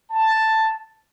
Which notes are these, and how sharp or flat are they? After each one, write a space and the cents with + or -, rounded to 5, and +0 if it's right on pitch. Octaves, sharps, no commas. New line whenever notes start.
A5 +5